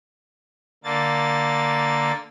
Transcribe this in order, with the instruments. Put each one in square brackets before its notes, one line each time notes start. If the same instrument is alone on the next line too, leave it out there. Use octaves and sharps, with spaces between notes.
[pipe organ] D3 A#3 A6